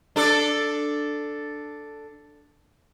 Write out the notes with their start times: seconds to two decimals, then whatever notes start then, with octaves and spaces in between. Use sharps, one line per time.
0.16 D4 A4 D5